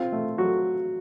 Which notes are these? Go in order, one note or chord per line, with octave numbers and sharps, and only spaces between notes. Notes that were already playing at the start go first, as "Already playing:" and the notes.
Already playing: C4 F4
A3
F#3 F#4